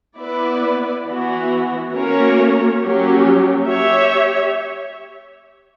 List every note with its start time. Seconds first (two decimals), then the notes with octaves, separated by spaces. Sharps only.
0.19 B3 E4 B4 D5
1.06 E3 B3 F#4
1.94 A#3 C#4 F#4 A#4 C#5
2.81 F#3 A#3 C#4 G4
3.67 G4 C#5 E5